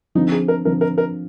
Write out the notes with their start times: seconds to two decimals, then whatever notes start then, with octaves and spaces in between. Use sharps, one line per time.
0.15 D3 F3 C4 D#4
0.32 G#4
0.48 A#4
0.65 D3 F3 C4 A#4
0.81 A#4
0.98 A#4